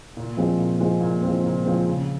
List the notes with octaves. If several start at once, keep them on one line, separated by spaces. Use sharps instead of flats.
A#2
F3 G#3 C4
A#2
F3 G#3 C4
A#2
F3 G#3 C4
A#2
F3 G#3 C4
C#3